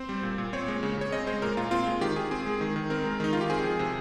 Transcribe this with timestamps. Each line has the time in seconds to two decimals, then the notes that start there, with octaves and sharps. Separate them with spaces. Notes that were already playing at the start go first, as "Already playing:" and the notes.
Already playing: C4 C5
0.09 G3
0.23 A#2
0.38 A#2
0.53 C4 C#5
0.68 G#3
0.83 C#3
0.98 C#3 C#5
1.12 C4 D#5
1.27 G#3 C5
1.42 A#2 A#4
1.57 A#2 F4
1.71 C4 F4
1.86 G#3
2.01 D#3 G4
2.16 D#3 G#4
2.31 C4 G#4
2.46 G#3
2.61 D#3
2.76 D#3
2.90 C4 A#4
3.05 G#3
3.20 D#3 D#4
3.33 D#3 F4
3.41 G4
3.50 C4 G#4
3.64 F3
3.79 C3